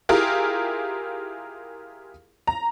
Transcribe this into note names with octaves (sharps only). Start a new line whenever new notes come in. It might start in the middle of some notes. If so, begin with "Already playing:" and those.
E4 F4 G4 G#4 A#4
A#5